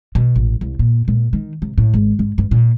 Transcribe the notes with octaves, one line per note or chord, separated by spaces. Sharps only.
B2
A1
C2
A#2
A#2
D#3
C3
A2
G#1
G#2
G2
A#2